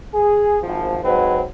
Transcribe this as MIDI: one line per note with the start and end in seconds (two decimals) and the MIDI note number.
0.14 0.57 68
0.63 0.98 32
0.63 0.98 53
1.04 1.43 44
1.04 1.43 54
1.04 1.43 60
1.04 1.43 71